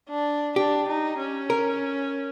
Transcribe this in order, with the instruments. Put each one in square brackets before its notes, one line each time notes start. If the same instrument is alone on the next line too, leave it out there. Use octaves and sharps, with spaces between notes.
[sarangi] D4
[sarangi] D4 [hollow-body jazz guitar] G4
[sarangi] D#4
C#4
[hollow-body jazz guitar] A#4